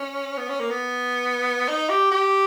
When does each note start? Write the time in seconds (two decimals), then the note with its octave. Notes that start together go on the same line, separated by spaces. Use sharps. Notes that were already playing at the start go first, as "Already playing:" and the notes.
Already playing: C#4
0.37 B3
0.49 C#4
0.60 A#3
0.70 B3
1.68 D#4
1.89 G4
2.12 G4